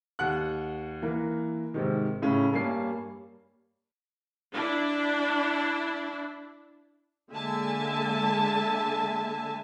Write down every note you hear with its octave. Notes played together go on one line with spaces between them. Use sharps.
D#2 F#5 F#6
E3 A#3 A#4
G#2 C3 D#3
A2 C#3 C#4
G2 G3 A#3 C#5 G#5 C7
D4 E4
D3 G#3 A#3 E5 G#5 A5